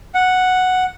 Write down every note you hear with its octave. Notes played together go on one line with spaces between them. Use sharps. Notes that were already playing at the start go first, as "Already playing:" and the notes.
F#5